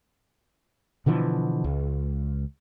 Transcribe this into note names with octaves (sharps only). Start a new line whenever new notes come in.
B2 D3 E3 F3
C#2